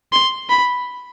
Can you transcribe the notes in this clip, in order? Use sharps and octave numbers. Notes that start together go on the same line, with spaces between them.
C6
B5